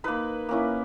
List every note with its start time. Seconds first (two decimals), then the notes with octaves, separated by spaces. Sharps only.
0.04 A#3 D#4 B4
0.49 A#3 C#4 E4